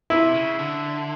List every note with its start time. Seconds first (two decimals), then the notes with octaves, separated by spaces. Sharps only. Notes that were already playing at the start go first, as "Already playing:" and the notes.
0.10 C3 E4
0.34 C#3
0.59 D3